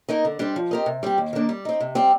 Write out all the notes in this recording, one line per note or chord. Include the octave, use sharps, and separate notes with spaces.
A#3 D#4 A#4 D#5
D3
G3 D4 G4 C5
F3
C4 G4 A#4 D#5
C3
G3 C4 G4
D#2
D#3 A#3 D4
G3
C4 D#4
C3
G3 C4 G4